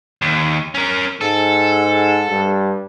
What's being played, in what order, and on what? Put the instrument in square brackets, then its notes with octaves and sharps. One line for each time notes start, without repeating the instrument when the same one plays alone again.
[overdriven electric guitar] D#2
C#4 A#4
[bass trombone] G#2 [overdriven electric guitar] A4
[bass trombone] G2